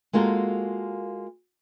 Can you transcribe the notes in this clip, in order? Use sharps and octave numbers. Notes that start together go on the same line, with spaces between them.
G#3 A#3 F4 F#4 A4 A#4